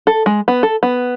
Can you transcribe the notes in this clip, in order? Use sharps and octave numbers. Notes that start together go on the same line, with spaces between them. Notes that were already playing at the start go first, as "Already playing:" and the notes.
A4
G#3
B3
A4
B3